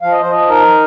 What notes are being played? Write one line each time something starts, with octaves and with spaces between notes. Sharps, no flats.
F3 F5
D#5
F3 C5
D#5
D#4 A#4